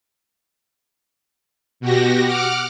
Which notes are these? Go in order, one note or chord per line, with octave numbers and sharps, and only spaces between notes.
B2 F#4 G4 A#6
F#5 D6 F6